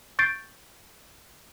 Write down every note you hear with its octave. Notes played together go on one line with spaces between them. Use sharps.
C#6 G6 A6 C7 D7